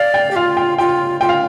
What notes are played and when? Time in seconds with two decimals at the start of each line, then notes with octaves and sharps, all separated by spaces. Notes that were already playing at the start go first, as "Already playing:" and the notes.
Already playing: D5 F5
0.14 G5
0.31 G4
0.36 F4 F5
0.57 G5
0.78 F4 G5
1.21 F4 G5
1.29 F5